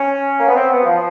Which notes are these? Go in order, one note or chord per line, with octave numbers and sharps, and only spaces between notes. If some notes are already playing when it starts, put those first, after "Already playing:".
Already playing: C#4
A#3
B3
C4
B3
F#3
F3